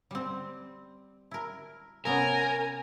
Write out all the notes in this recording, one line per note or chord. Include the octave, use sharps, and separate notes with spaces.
G3 C4
E4 A#4
C3 B3 C#4 A#4 G#5